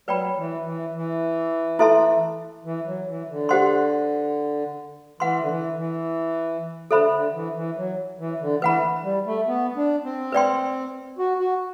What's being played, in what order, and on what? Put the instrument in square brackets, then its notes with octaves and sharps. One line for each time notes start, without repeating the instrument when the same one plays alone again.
[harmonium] F#3 [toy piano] B4 D5 G5 B5
[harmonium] E3
E3
E3
[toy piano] E4 A4 E5 A5 C6
[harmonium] E3
F#3
E3
D3
[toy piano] G4 C5 F#5 C6
[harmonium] E3 [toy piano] B4 F#5 C6
[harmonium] D3
E3
E3
[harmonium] D3 [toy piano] A4 C5 E5 B5
[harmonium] D3
E3
E3
F#3
E3
D3
[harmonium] E3 [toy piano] B4 F#5 B5
[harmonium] G3
A3
B3
D4
C4
[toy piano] B4 D5 G5 C6
[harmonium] F#4
F#4